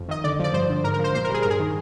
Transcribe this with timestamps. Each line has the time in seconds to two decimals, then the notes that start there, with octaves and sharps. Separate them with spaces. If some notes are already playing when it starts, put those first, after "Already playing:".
Already playing: F2
0.08 D#3 D#5
0.24 D3 D5
0.39 F3 D5
0.53 G2 C5
0.69 D3
0.84 G#2 A#4
0.94 A#4
0.99 F3
1.04 C5
1.15 A#2 C5
1.24 A#4
1.29 G3 G#4
1.42 G2 A#4
1.50 G#4
1.59 D#3